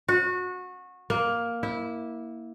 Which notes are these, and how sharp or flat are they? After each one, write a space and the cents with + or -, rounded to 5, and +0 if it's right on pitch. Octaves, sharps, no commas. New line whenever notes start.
F#4 -25
A#3 +5
E4 -15